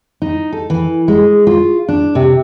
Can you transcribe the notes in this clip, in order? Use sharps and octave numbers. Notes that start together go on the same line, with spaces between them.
D#4
A4
E3
G#3
F4
D4
C3